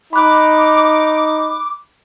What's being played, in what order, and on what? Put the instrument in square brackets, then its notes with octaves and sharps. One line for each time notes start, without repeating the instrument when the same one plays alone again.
[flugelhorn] D#4 [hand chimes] B5 F#6 [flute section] D6